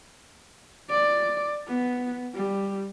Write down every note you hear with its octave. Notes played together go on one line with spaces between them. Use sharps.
D5
B3
G3